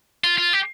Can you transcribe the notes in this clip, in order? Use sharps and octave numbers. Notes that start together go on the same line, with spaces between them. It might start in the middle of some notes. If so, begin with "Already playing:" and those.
F4
F4
G4